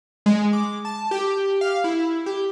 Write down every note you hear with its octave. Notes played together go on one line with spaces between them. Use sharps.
G#3
D6
A5
G4
F5
E4
G4